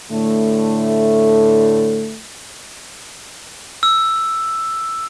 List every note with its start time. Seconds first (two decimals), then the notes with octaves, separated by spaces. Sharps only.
0.12 A2 D3 A3
3.83 E6